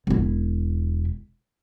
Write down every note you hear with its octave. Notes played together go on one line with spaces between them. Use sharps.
E1 E4